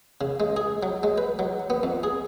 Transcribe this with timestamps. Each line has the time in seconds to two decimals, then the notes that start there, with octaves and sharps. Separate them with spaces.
0.21 C#3
0.40 G#3
0.57 G#4
0.83 F#3
1.03 G#3
1.18 B4
1.39 F#3
1.70 B3
1.83 F2
2.03 G#4